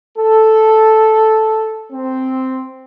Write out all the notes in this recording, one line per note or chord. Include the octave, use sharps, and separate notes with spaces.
A4
C4